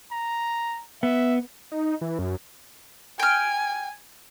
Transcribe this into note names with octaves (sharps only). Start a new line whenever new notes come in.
A#5
B3 E5
D#4
E3
F#2
G5 G#5 F6